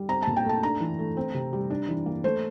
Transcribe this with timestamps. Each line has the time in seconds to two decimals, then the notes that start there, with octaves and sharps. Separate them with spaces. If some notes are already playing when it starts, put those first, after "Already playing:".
Already playing: G3
0.09 C4 A#5
0.23 A#2 A5
0.36 G5
0.45 A3 A5
0.63 D4 A#5
0.80 E3
0.99 A3
1.17 C4
1.34 C3
1.53 G3
1.70 D4
1.89 E3
2.06 A#3
2.24 A3 C5